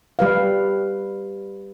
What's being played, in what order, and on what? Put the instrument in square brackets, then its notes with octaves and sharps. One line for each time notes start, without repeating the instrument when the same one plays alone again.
[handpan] G3 B4 F5